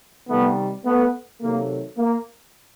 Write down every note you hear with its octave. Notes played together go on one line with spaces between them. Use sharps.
C3 D#3 G3 A3 B3
A3 B3
C3 D#3 F#3 A3 A#3
A#3